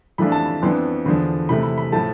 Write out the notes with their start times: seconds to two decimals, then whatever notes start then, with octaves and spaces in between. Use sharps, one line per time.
0.18 F2 E3 A3 D4 F4 B5
0.32 A5
0.45 B5
0.62 F2 E3 B3 D4 C6
1.05 E2 D3 F3 B5
1.49 C3 E3 A3 B5
1.63 B5
1.78 B5
1.92 A2 F3 A3 A5